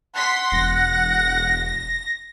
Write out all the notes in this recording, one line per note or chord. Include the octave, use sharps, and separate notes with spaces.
F#5 C6 B6
E1 A#6